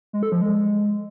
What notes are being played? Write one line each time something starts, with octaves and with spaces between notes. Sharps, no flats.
G#3
A4
F3
G#3